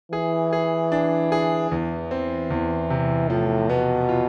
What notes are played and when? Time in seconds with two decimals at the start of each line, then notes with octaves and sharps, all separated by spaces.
0.12 E3 G#4
0.53 G#4
0.92 D4
1.32 G#4
1.71 E2 E3
2.11 C4
2.50 E2
2.90 C3
3.29 A2 F3
3.69 B2 B3
4.09 F4